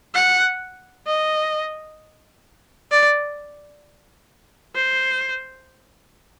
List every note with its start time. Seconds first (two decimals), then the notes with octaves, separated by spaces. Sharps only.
0.14 F#5
1.06 D#5
2.91 D5
4.75 C5